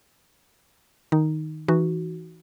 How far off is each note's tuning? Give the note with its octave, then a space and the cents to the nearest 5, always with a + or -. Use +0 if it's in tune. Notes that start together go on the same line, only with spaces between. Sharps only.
D#3 +0 D#4 +0
E3 +0 D#4 +0 F#4 +0